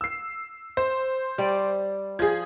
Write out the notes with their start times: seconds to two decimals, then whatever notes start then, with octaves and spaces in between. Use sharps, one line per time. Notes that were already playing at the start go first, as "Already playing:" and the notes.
0.01 E6 C7
0.77 C5
1.38 G3 D5
2.19 F3 G#4 G#6